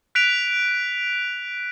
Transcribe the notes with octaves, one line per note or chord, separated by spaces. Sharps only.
F#6 B6 D7 F7